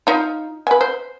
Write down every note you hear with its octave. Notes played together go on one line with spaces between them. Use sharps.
D#4 F4
B4 G#5
C5